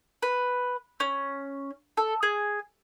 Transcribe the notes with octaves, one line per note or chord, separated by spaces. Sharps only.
B4
C#4
A4
G#4